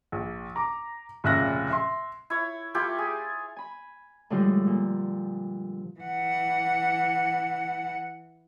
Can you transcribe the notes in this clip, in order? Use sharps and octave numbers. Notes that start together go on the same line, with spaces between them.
A#1
A#5 D6
F1 A#2 C#3 E5 F#6 A#6
E5 C6
E4 C#5
A3 E4 F4 G4
G#4
G#5 B5
A2 D3 F3 G3 G#3 F4
A#2
E3 F#5